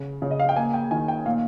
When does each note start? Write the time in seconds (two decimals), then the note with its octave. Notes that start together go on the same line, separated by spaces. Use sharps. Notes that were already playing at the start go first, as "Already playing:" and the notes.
Already playing: C#3
0.22 C#3
0.31 D#5
0.40 F5
0.49 G5
0.56 A#3 G#5
0.74 G5
0.91 D#3 G#5
1.08 G5
1.26 A#2 F5